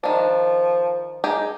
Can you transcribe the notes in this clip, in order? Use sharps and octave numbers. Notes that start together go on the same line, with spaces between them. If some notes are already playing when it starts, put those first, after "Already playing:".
D#3 F3 D4
D#4 G4 G#4